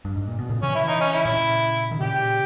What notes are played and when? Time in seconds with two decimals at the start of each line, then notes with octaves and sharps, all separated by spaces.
0.05 G2
0.15 G#2
0.27 A#2
0.39 B2
0.50 A#2 C#3
0.62 C#3 E3 C#4
0.75 C#3 E3 E4
0.88 D#4
1.01 C#4
1.13 E4
1.25 A#2 C#3
1.91 D#3
2.00 A#2 C#3 G4